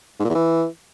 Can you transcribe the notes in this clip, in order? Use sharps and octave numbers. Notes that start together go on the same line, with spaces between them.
G#2
A#2
E2
E3